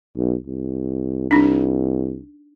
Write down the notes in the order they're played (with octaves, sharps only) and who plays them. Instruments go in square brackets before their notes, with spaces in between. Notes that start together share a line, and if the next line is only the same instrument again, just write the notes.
[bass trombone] B1
C2
[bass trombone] C2 [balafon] D4 D#4